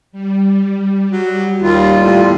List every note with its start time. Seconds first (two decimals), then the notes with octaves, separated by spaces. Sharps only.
0.12 G3
1.11 F#3
1.62 D#2 G3 F4
2.04 E2 A2